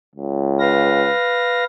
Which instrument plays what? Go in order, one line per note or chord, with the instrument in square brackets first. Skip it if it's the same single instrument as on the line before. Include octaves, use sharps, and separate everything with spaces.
[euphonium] C#2
[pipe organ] B4 F5 A#6